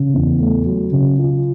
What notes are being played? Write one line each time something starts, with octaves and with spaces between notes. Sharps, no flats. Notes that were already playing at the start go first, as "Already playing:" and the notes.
Already playing: C#3
E2
A3
F#3
C#3
F4